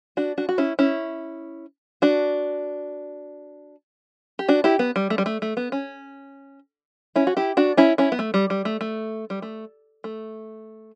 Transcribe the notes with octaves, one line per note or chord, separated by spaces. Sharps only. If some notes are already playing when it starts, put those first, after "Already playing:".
D4 F#4
D4 F#4
F#4
C#4 E4
C#4 E4
D4 F#4
G4
D4 F#4
E4 G4
B3
G3
A3
G3
A3
A3
B3
C#4
C#4 E4
F#4
E4 G4
D4 F#4
C#4 E4
C#4 E4
B3
A3
G3
G3
A3
A3
G3
A3
A3